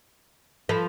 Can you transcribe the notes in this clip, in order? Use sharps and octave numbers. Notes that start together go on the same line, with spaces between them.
F3 A4 B4 A5 B5